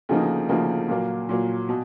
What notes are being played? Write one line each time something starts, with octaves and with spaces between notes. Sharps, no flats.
D2 C#3 F3 A#3 D#4
D2 C#3 F3 A#3 D#4
A#2 F#3 A#3
A#2 F#3 A#3
B2